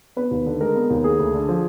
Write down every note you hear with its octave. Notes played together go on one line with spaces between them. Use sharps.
B3 B4
D#2
D3
G#3 A#4
B3
D#2
A#3 G#4
D2
D3
F3